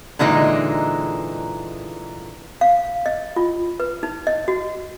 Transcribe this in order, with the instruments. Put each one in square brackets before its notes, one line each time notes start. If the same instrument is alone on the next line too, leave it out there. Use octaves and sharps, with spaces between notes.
[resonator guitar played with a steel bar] A#2 D3 E3 G#3 D#4
[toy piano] F5
D#5
F4
B4
D#4
D#5
F#4